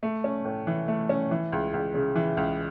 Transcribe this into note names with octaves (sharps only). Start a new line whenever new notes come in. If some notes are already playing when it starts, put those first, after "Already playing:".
A3
C#4
A2
E3
A3
C#4
E3
C#2
C#2
C#3
E3
C#2